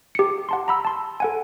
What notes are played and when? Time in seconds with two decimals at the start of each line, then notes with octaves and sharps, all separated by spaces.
0.15 G4 C#7
0.49 F#5 A5 C6
0.68 A#5 B5 E6
0.85 A5 C6
1.20 A4 F#5 G#5